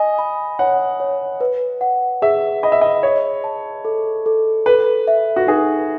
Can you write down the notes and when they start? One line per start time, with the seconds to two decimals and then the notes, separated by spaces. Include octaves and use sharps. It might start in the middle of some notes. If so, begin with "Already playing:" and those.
Already playing: D#5 G#5
0.18 B5
0.59 C#5 F#5
1.00 C#5
1.41 B4
1.81 F#5
2.22 G#4 E5
2.63 D#5 B5
2.72 E5
2.81 D#5
3.03 C#5 D#5
3.44 A5
3.85 A4
4.26 A4
4.66 A4 B4
5.07 E5
5.36 F#4
5.47 D#4 G#4